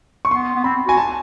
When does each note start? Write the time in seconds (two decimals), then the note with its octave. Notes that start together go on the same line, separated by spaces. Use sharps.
0.25 C#6
0.31 B3 C6
0.55 B3
0.64 C4 B5
0.87 F#4 G#5
0.97 A5